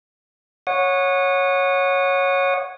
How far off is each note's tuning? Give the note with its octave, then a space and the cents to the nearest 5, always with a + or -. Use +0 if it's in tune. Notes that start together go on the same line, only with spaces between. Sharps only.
C#5 -5 F#5 -20 D#6 -25